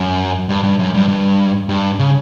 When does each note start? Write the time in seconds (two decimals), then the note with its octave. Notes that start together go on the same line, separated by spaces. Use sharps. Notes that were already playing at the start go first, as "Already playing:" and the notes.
Already playing: F#2
0.49 G2
0.64 G2
0.79 F#2
0.94 G2
1.08 G2
1.69 G2
1.99 C#3